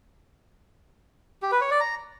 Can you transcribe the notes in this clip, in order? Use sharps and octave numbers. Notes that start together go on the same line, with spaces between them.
G4
B4
C#5
D5
A#5